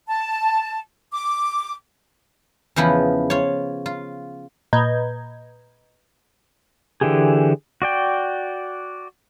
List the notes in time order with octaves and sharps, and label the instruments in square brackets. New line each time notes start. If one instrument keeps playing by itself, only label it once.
[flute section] A5
D6
[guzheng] E2 C#3 E3 F3 B3 E4
F4 C#5
F4
[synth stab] A#2 B4 D#5 A#5 G6 G#6
[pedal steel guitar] D3 E3 G4 G#4
F#4 D5 G5